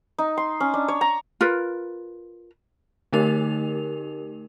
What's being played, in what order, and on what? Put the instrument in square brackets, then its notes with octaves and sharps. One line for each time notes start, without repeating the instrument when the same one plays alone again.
[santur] D#4
C6
C#4
D4
C#5
A#5
[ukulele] F4 A#4 B4
[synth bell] D3 A3 D#4 G4 A#4 F7